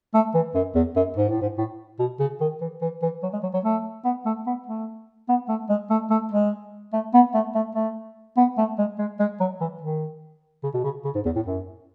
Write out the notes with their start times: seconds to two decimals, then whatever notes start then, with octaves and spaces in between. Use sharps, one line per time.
0.14 A3
0.34 E3
0.55 F#2
0.75 E2
0.96 F#2
1.17 G#2
1.29 A2
1.41 G#2
1.58 A2
1.99 B2
2.20 C#3
2.41 D#3
2.61 E3
2.82 E3
3.02 E3
3.23 F#3
3.33 G#3
3.43 F#3
3.54 F#3
3.64 A3
4.05 B3
4.26 A3
4.46 B3
4.67 A3
5.29 B3
5.49 A3
5.69 G#3
5.90 A3
6.11 A3
6.32 G#3
6.93 A3
7.14 B3
7.34 A3
7.55 A3
7.75 A3
8.37 B3
8.58 A3
8.78 G#3
8.99 G#3
9.20 G#3
9.40 F#3
9.61 E3
9.81 D#3
10.64 C#3
10.74 B2
10.84 C#3
11.05 C#3
11.15 G#2
11.25 E2
11.36 A2
11.46 F#2